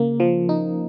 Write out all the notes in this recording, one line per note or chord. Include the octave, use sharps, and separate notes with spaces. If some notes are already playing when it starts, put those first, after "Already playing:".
Already playing: C#3 A#3
F3
D#4